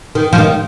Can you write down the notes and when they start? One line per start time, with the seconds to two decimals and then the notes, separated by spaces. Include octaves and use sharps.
0.15 D#3
0.33 F3
0.38 D#3